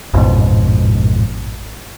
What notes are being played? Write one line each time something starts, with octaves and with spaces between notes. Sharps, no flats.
A1 F2 G#2 B2